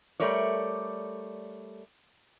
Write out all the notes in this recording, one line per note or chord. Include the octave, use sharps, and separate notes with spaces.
G3 A3 A#4 C#5 D5